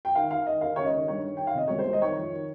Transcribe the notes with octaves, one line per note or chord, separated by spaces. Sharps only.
G5
D#3 F5
D#3 F5
D#3 D#5
D#2 F5
C#3 C#5
D#5
D#2
G2 C#5
D#3
D#3 G5
F5
C3 D#5
C2 C#5
C5
C2
D#5
D#3 C#5
F2
D#3